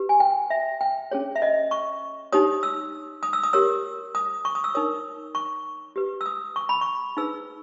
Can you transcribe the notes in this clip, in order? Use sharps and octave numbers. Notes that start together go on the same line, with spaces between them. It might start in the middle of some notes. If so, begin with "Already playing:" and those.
Already playing: G4 B4
G#5
G5
E5
G5
C#4 G#4 C#5
E5
D#5
C#6
D#4 G4 C#5 D#6
E6
D#6
E6
D#6
G4 A#4 C#5 E6
D#6
C#6
D#6
E6
D#4 A#4 C#5 D#6
C#6
G4 B4
E6
D#6
C#6
B5
C#6
D#4 G#4 B4 E6